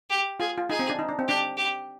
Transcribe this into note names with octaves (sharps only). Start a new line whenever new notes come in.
G4
F4 G#4
F4
D#4 G#4
C4
D4
D#4
D4
C4
D4 G4
G4